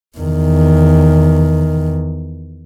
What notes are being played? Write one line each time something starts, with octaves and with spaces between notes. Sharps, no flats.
E2 D#3